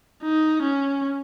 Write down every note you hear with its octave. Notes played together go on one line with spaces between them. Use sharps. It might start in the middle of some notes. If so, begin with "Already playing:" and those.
D#4
C#4